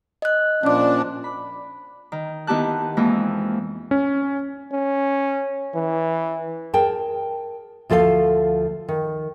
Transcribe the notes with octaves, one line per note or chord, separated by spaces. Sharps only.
D#5 F#6
A#2 F3 C#4 D4 D6
B5
D#3
D#3 B3 E4 G4 A5 F#6
F2 E3 G#3 A#3
C#4
C#4
E3
G#4 A#4 G5 A5
D2 F3 A4 C5 F5
D#3